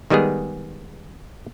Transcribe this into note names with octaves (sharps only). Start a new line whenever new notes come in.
D#3 G3 G#3 B3 G#4